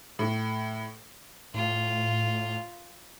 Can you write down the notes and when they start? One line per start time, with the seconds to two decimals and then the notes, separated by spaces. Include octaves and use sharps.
0.19 A2
1.54 A2 F4